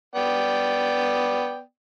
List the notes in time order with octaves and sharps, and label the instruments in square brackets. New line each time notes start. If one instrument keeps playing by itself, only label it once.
[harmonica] B3 D5 G5